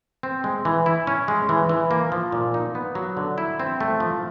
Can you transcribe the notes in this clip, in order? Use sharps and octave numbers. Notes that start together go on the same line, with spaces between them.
C4
G#3
E3
E4
C#4
G#3
E3
E3
A#3
F3
A#2
D#4
B3
F#3
D3
E4
C4
A3
F3